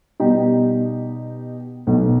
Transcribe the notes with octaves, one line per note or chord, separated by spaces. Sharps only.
B2 G3 D#4 G4
B1 B2 A3